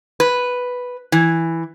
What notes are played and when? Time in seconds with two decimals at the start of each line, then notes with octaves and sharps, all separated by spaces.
0.20 B4
1.12 E3